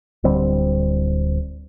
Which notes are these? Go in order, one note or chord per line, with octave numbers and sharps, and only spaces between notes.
D1 D3 G3 C4